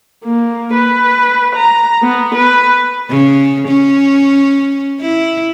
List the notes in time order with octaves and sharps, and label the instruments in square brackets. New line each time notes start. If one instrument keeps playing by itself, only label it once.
[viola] A#3
B4
A#5
B3
B4
[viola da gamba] C#3
C#4
E4